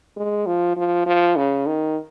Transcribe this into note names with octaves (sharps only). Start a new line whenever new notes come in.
G#3
F3
F3
F3
C#3
D#3